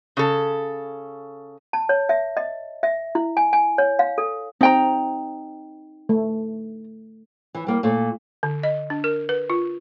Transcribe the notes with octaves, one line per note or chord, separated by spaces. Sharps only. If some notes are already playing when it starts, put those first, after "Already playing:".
C#3 A4
A5
C#5
E5
D#5
E5
E4
G#5
G#5
C#5
F5
A4
C4 D#4 G5 A#5
A3
E3
G3 A#3
A#2 A3
D3
D#5
D4
A#4
B4
F4